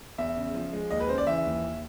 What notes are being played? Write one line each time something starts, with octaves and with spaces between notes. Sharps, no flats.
E2 E5
C#3
F3
G#3
D#2 D#5
B4
C#3 C5
D5
E3 E5
D#2